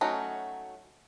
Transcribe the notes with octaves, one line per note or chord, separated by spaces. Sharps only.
F#3 A3 C#4 D#4 F#4